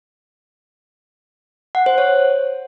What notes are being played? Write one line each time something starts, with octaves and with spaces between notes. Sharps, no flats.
F#5
C5
C#5